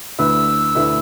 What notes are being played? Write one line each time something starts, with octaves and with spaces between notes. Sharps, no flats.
D2 D3 A3 E4 B4 E6
D2 D3 A3 E4 B4